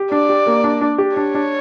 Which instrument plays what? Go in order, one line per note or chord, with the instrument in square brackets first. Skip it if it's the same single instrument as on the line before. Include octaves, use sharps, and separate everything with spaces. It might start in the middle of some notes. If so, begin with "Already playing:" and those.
Already playing: [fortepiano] G4
[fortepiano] D4 [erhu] D5
[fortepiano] G4
A#3
D4
D4
G4
[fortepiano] D4 [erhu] C#5
[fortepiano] D4